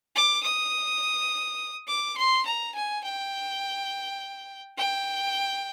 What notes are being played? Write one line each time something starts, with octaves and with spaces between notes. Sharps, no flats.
D6
D#6
D6
C6
A#5
G#5
G5
G5